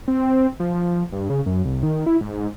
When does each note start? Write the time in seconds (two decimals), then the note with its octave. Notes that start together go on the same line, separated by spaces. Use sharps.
0.08 C4
0.60 F3
0.75 F3
1.12 G2
1.30 C#3
1.46 F#2
1.65 C2
1.83 D#3
2.06 E4
2.21 G#2